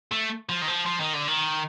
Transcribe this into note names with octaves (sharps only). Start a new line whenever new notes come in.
A3
F3
D#3
F3
F3
D#3
D3
D#3